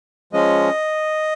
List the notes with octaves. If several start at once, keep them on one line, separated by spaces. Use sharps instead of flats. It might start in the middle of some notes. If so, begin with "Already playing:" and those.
F3 G#3 C#4 D#5